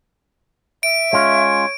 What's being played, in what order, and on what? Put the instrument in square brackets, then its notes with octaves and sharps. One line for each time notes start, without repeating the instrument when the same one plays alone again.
[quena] E5 [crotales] D7
[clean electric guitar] G#3 C#4 F4 [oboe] C#5